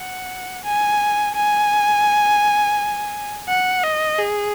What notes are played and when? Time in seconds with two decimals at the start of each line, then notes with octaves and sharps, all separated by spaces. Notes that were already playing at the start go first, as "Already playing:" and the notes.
Already playing: F#5
0.64 G#5
1.35 G#5
3.48 F#5
3.83 D#5
4.19 G#4